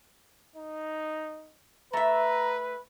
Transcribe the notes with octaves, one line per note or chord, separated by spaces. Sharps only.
D#4
A3 B4 E5 A#5